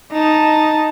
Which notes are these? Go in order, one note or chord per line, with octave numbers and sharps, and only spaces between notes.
D#4 A5